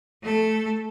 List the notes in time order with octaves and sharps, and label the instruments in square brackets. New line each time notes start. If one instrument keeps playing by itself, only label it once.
[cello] A3 A4